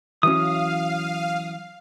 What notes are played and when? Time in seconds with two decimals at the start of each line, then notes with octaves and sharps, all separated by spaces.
0.23 E3 F#3 C#4 F5 D#6